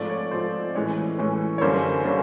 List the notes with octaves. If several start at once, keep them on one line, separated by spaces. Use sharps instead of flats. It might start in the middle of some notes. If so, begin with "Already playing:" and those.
Already playing: G#2 F3 A3 C4 D5
C#5
G#2 F3 A3 C4 C5
A2 E3 G#3 C#4 C#5
A2 E3 G#3 C#4
C#5
F#2 D3 G3 A#3 C#4 C5
D3 G3 A#3 C#4